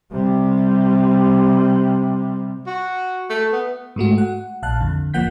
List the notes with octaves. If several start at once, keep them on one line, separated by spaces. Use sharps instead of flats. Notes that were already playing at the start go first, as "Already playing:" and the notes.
C3 G3
F#4
A3
B3
G#2 G#3 A3 F#4
F#5
A#1 F5 A5 F#6
F2 D3
G#1 F3 A#3 F#5 G6 B6